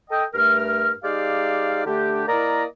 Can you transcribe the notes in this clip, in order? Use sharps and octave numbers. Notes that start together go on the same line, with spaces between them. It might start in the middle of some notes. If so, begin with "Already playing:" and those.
A4 D#5 G5
G2 A3 A#4 F6
G#3 D#4 G4 D5 F5
D3 A3 D4 G4
A#3 E4 A#4 D5 D#5 A#5